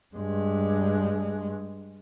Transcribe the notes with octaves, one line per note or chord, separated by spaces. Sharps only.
G2 G#3